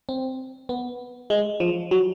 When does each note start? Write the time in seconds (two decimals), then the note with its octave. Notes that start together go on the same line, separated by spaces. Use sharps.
0.09 C4
0.69 B3
1.30 G#3
1.60 F3
1.91 F#3